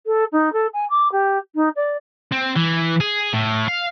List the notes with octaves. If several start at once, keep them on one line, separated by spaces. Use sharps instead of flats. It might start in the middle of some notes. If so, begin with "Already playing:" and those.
A4
D#4
A4
G#5
D6
G4
D#4
D5
C4
E3
G#4
A2
F5